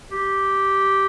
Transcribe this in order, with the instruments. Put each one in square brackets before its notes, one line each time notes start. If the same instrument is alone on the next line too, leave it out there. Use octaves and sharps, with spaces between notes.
[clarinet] G4